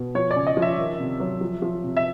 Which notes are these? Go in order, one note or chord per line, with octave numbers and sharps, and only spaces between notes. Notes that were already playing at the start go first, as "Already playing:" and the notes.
Already playing: B2
F3 C#5
D5
C#3
D#5
F3
E5
D#3
C3
F#3
F3
F3
C3
E5